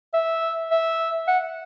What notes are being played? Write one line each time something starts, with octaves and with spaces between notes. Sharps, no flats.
E5
E5
F#5